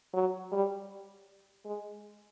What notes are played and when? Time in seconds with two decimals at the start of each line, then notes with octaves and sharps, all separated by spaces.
0.14 F#3
0.52 G3
1.66 G#3